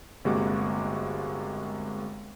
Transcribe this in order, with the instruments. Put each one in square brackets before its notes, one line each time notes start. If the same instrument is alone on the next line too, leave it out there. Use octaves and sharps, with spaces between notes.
[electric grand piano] G1 C3 G#3 A#3 F#4 D6